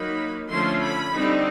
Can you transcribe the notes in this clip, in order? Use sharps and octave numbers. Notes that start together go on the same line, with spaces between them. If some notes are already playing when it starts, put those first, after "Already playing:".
Already playing: F#3 A#3 D#4 B5
D3 F3 A3 C#4 C6
B5
D3 G3 C4 D#4